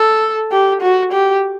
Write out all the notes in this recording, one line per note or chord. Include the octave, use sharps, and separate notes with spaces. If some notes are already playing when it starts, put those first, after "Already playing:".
Already playing: A4
G4
F#4
G4